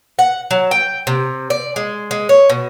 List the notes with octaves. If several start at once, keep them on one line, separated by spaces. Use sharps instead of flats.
F#5
F#3
G5
C3
D5
G#3
G#3
C#5
B2